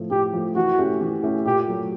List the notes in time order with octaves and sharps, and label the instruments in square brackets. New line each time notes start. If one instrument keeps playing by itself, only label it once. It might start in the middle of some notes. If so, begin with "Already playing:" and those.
Already playing: [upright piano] A2 F3 A3
[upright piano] A2 [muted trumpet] G4
[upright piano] F3 A3
[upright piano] E3 [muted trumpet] F#4
[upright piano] A3 C#4 E4 G4
E3
A3 C#4 E4 G4
[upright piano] A#2 [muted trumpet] G4
[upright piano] F#3 A3